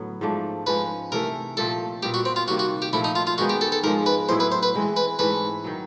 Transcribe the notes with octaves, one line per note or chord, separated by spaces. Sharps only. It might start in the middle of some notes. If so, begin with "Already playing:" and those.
Already playing: A2 D3 F#3 B3
G#2 F3 A3 D4
G#2 F3 G#3 C#4 B4
C3 E3 A3 A#4
A#2 F3 A3 C4 A4
A#2 G3 B3 G4
F#4
C4
F4
C3 D#3 G3 A#3 F#4
F#4
G4
A#2 F3 A3 E4
D#4
F4
F4
D#3 G#3 B3 D#4 F#4
G4
A4
A4
G#2 F3 G#3 A#4
B4
A2 F#3 B3 E4 C5
B4
C5
B4
E3 G#3 C4
B4
G#2 E3 A3 B4
D#3 F#3